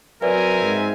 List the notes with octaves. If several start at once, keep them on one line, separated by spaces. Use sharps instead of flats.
F#3 C4 A#4 B4 D5 E5 G#5
G#2